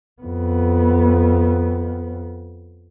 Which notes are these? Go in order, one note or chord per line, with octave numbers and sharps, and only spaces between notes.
F2 B3